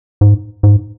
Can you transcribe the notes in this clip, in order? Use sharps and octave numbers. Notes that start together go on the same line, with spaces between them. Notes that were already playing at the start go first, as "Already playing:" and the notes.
G#2
G#2